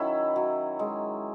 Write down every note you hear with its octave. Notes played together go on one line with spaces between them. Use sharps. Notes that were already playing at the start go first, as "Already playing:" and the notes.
Already playing: D#3 F#3 C#4 E4
F#3
G#3